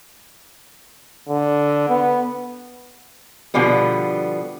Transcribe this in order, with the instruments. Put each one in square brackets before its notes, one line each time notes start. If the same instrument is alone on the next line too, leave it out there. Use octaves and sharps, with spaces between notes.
[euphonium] D3
B3
[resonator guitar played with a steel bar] B2 D3 F3 G3 B3